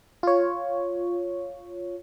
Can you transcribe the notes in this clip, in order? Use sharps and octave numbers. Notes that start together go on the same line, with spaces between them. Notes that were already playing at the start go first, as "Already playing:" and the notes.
F4 C#5